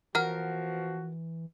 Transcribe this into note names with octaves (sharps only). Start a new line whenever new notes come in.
B2 E3 F3 F#4 A#4 F#5 A#5 F6